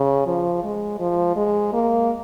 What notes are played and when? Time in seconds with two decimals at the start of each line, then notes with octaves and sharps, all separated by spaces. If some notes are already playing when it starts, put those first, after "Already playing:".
Already playing: C#3
0.27 F3
0.64 G#3
1.00 F3
1.36 G#3
1.73 A#3